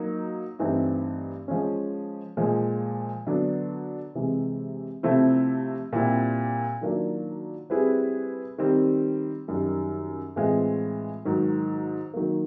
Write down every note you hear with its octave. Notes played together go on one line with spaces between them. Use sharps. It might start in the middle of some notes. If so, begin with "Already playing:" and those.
Already playing: F#3 A#3 D#4
G2 E3 A3 C4 D#4
F3 G#3 C#4
A#2 F3 G#3
D3 F#3 B3 D4
C3 E3 G#3
C3 F3 A3 C4 E4
A#2 G3 C4 E4 G4
D#3 F#3 A#3 D4 F4
G3 C4 E4 G#4 B4
D#3 G3 C4
F#2 D#3 G3
A2 E3 G#3 C4 F4
G#2 D#3 F#3
D#3 F#3 A#3